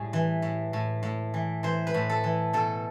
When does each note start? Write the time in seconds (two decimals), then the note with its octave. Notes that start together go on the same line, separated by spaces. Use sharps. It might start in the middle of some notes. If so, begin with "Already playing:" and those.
Already playing: A2 G3 G#4
0.13 E3
0.42 A2
0.73 A2
1.03 A2
1.34 E3
1.63 E3 C5
1.87 B4
1.94 A2
2.10 A4
2.24 E3
2.53 B2 A4